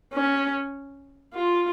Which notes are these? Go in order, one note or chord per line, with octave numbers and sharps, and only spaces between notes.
C#4
F4